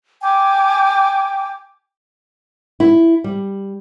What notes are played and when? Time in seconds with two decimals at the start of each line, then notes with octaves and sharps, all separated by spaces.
0.21 G5 G#5 D6
2.80 E4 E5
3.24 G3